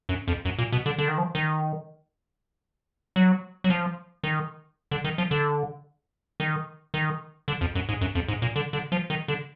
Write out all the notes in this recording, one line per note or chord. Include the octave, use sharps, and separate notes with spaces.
F#2
F2
F#2
A#2
B2
D3
D3
D#3
F3
D#3
F#3
F#3
F3
D#3
D3
D#3
F3
D3
D#3
D#3
D3
F2
F#2
G#2
F#2
F2
G#2
A#2
D3
D3
F3
D#3
D3